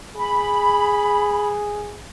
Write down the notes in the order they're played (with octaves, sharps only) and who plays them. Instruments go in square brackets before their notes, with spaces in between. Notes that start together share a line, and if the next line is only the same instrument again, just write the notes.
[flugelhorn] G#4 [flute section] B5